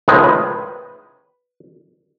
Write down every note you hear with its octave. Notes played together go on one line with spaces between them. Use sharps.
C#2 A2 D#3 F3 G#3
B4